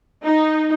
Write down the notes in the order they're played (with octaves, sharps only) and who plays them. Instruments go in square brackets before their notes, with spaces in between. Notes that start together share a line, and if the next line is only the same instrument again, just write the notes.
[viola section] D#4